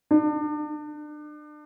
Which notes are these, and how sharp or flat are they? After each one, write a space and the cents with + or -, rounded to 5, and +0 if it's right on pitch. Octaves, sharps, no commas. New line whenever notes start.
D4 +35